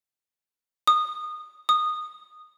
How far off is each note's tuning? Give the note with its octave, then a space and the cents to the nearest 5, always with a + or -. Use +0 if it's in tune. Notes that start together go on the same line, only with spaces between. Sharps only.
D#6 -20
D#6 -15